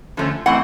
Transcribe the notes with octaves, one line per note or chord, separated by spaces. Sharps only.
D3 F3 A3 C#4
E3 A3 C4 F#5